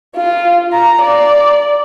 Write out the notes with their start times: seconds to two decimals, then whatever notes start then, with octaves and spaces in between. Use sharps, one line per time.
0.16 F4
0.73 A#5
1.02 D5